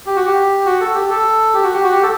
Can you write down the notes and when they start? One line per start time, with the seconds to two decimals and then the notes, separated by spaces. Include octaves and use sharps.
0.06 G4
0.16 F#4
0.26 G4
0.65 F#4
0.80 A4
0.94 G4
1.10 A4
1.54 G4
1.63 F#4
1.73 G4
1.83 F#4
1.92 G4
2.03 A4